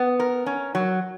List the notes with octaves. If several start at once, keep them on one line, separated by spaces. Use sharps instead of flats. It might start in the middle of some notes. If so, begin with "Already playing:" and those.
Already playing: B3
A#4
C#4
F#3